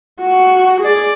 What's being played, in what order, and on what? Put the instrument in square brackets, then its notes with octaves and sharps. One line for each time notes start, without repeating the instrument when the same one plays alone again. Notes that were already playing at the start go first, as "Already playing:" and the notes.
[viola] F#4
G#4 D5